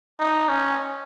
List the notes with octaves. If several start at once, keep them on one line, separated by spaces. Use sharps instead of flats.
D#4
C#4